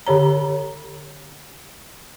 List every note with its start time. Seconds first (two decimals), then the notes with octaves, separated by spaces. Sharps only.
0.07 D3 G4 C#5 A#5